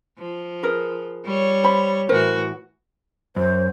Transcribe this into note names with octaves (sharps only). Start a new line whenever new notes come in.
F3
G#4 A#4 B4
G3 C#5
C5 B5
A2 E3 F#4 A#4 C5
F#2 C5